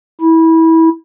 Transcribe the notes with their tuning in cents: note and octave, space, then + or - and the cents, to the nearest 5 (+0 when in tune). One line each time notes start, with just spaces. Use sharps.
E4 -20